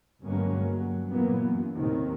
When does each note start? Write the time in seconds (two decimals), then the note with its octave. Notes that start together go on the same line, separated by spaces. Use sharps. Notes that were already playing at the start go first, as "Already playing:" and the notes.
0.24 G1 G2 F#3 G#3 A#3 C#4
0.70 G2 F#3
1.09 A#2 E3 F#3 A#3 B3
1.40 F#2
1.76 D#2 A2 C3 D#3